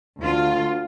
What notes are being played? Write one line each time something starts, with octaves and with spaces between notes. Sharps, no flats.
D2 F4